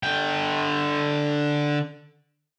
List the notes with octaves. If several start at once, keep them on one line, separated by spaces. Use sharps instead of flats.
D3 G5